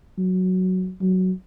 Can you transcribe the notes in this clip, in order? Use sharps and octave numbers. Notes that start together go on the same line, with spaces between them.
F#3
F#3